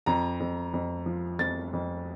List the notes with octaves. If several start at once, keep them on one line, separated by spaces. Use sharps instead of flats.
F2 A#5
F2
F2
F3
F2 A6
F2